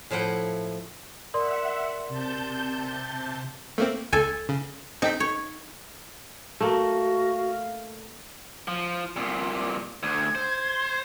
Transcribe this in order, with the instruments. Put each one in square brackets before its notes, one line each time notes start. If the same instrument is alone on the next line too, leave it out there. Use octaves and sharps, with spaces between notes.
[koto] A2 F3 E4 F#5 G5
[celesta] A#4 D5 C6 [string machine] E5 F#5
[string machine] C3 A5 G6
[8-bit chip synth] A3 A#3 C4
[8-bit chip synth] C#2 [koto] A4 G#5
[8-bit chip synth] C#3
[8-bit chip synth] C4 G5 B6 [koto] D#4
[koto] C#5
[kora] A3 A#3 [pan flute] F#4 [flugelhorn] F5
[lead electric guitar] F3
C2 A#2
[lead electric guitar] D2 [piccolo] G#6
[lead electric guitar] C5